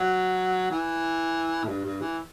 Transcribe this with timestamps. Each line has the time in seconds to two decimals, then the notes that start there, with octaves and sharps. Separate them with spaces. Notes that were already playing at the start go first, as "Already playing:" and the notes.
Already playing: F#3
0.71 E3
1.64 A2
1.68 G2
1.85 G2
2.01 E3